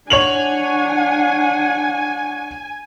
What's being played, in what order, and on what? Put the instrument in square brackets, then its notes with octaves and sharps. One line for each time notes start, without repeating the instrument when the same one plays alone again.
[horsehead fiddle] D4 F#5 [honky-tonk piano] C#5 F7 F#7 [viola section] G#5